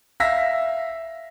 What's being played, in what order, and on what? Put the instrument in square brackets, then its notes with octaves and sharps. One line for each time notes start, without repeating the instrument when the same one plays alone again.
[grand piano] E5 F5 E6 A#6 B6